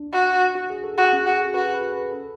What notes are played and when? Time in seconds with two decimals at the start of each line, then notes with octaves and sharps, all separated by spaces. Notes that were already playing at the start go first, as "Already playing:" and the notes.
Already playing: D4
0.13 F#4
0.55 F#4
0.70 G#4
0.84 A4
0.98 F#4 G#4
1.13 C#4
1.26 F#4 G#4
1.40 A4
1.54 F#4 B4
1.74 B4
1.92 B4
2.12 A4